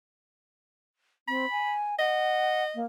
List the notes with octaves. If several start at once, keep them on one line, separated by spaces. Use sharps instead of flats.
C4 B5
G#5
D#5 F#5
A#3